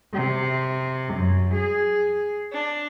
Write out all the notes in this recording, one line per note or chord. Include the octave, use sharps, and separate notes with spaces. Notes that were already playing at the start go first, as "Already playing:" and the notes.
C3
F#2
G#4
D4